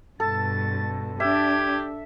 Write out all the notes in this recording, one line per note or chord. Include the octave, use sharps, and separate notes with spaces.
G2 B2 A4 A6
D4 G4 E5 G#6